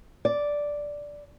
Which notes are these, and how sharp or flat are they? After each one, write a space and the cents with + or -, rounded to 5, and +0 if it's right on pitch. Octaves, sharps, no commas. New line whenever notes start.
D5 -5